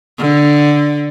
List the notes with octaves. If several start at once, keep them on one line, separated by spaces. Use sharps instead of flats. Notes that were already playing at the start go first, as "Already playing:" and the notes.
D3